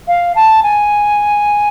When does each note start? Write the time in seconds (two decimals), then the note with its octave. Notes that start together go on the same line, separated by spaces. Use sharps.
0.08 F5
0.36 A5
0.63 G#5